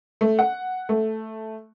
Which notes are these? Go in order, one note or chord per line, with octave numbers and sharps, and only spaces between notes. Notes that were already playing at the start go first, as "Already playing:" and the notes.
A3
F#5
A3